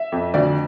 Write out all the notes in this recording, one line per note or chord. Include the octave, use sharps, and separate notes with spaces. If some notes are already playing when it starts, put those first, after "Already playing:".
Already playing: E5
F2
D2 D5